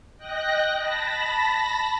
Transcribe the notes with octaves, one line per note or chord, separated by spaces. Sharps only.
D#5 G5 F#6 A#6
A5 B5 A#6